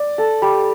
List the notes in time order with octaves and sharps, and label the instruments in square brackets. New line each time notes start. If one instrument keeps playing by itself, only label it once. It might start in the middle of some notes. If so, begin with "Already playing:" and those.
Already playing: [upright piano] D5
[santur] A4
G3